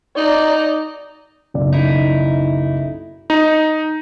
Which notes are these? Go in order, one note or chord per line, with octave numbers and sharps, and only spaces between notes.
D#4 D5 A#5
F#1 B1 D5
D#4 E4
D#4